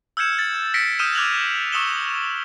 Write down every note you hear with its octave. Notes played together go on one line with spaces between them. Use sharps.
E6 F6 G6 G#6 C#7 E7
A6
F6 A#6 B6 C#7 D7 E7
D#6 F6 G6 D#7 E7
D6 F6 F#6 G#6 F7 F#7
C#6 D#6 E6 C#7 E7 G7